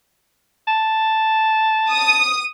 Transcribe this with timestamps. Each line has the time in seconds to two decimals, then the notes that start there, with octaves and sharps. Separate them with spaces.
0.68 A5
1.91 D#6